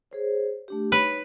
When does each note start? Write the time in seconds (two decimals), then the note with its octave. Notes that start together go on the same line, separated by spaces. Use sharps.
0.11 G#4 C5 C#5
0.68 A3 D4 G4
0.92 D#4 B4 C#5